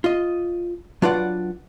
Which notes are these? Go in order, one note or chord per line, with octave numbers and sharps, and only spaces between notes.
F4 D#5
F#3 D4 F4 B4 D5 F#5